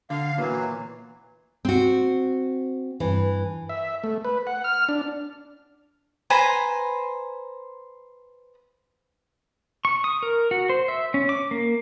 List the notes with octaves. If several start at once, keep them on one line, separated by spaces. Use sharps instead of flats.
D3 F5
A#2 E3 F#3
C4 F#4
G2 E3
E5
A3
B4
F#5
F6
D4
B4 C5 G#5 A#5
C#6
D#6
A#4
F#4
C5
E5
C#4
D6
A#3